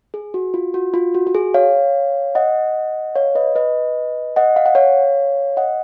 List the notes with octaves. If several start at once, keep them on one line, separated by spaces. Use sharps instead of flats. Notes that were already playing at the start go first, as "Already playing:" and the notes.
G#4
F#4
F4
F#4
F4
F#4
F#4
G#4
C#5 F5
D#5 F#5
C#5 F5
B4 D#5
B4 D#5
D#5 F#5
F5
F#5
C#5 F5
D#5 F#5